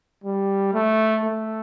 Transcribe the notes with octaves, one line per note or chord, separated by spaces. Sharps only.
G3
A3
A3